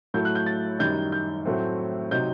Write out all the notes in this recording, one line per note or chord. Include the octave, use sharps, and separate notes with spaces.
A2 F#3 A3 E4 G6
F#6
G6
A6
F#2 D#3 G3 D#4 G6
G6
A2 F#3 A3 C4
C3 F#3 C4 D#4 G6